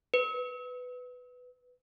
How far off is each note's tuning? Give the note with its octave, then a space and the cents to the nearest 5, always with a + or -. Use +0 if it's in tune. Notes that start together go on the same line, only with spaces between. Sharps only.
B4 +10